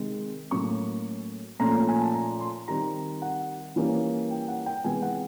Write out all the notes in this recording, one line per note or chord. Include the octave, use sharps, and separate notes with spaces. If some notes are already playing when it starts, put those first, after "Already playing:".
Already playing: C3 D#3 G#3
A2 F#3 A#3 C#4 C#6
A#2 F3 A3 C#4 A#5
G#5
A5
A#5
C6
D#3 G3 C4 A#5
F#5
E3 G3 A#3 C#4
G5
F#5
G5
C3 E3 G#3 B3 G#5
F#5